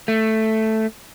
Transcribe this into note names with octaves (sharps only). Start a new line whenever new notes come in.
A3